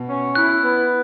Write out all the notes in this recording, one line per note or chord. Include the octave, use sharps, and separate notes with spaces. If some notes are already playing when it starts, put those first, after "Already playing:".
Already playing: B2
C#4
E4 F#6
B3